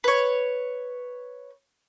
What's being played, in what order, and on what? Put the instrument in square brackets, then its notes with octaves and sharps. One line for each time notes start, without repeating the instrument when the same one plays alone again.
[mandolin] B4 C#5